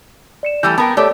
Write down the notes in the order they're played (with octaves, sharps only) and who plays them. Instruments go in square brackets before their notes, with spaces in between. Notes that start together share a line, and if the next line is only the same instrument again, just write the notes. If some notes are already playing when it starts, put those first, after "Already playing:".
[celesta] D5 C#7 E7
[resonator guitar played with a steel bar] E3 G3 A3 [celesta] G6
[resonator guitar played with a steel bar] B3 A#4 G5 [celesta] A5
[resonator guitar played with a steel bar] A3 G4 [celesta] A4 C#5 D5